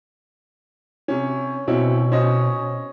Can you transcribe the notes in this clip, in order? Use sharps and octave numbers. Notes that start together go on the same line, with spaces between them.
C3 C#4
B2 C4 C#4 E4
C#4 C5 D#5